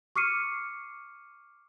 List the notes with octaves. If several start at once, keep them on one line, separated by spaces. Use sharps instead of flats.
C#6 D6 F6 C7 C#7 D#7